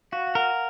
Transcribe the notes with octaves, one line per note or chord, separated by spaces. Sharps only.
F#4 F5
F5
A#4 F#5